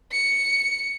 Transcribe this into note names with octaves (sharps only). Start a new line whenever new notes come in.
C#7